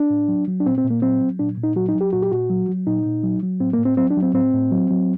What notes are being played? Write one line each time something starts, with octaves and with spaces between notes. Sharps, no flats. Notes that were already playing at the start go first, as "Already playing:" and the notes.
Already playing: D4
A2
F#3
F#3
D4
A#2 C4
C4
A#2
A#3
F#3 C4
F#3
A#2 D4
A#2
D#4
F#3 F#4
D#4
F#3
G4
A#2 F#4
G4
A#2 F#4
F#3
F#3
A#2 D#4
A#2
F#3
F#3
A2 C4
A#3
A2
C4
F#3 C4
D4
F#3
C4
A2 C4
A2
F#3
F#3